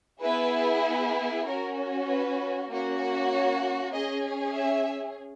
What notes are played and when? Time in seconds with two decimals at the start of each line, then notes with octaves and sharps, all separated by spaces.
0.21 B3 E4 G#4 B4
1.45 C#4 F#4 A#4
2.07 B4
2.69 A#3 C#4 F#4
3.30 C#5
3.92 C#4 G#4 D#5
4.54 E5